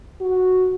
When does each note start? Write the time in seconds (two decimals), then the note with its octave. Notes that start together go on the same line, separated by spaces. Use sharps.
0.21 F#4